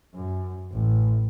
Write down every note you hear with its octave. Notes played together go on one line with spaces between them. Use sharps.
F#2
A1